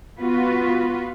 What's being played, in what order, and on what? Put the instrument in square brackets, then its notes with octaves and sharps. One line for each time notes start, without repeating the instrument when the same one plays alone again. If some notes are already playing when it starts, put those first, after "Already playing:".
[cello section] B3 F4 F#4 B4